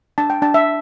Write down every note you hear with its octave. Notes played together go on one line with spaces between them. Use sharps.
D4 A5
G5
D4 A5
E5